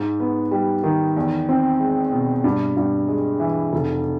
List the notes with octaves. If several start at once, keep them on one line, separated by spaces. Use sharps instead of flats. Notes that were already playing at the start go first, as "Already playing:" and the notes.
Already playing: G#2
B3
G3
D#3
E2
C4
G#3
B2
G2
G2
G#3
E3
F1